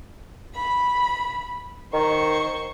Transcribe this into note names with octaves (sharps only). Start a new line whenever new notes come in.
B5
D#3 C5 C#6